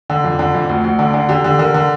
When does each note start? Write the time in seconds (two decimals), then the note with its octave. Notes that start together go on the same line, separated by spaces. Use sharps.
0.10 D3
0.24 F2
0.39 D3
0.55 F2
0.69 D2
0.84 D2
0.99 D3
1.14 D3
1.29 D3 G4
1.44 D3
1.59 D3 A#4
1.74 D3